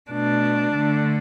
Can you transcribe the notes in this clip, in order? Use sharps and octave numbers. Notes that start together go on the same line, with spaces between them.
B2 A3 D4
D3 A3